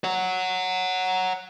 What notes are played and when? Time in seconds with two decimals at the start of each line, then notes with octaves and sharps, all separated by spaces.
0.04 C#5 F#5